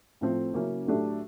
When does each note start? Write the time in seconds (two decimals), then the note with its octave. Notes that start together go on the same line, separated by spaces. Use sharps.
0.21 A2 F3 A3 C4
0.54 C#3 F#3 A#3 C#4 E4
0.85 A2 F#3 A3 D4 G4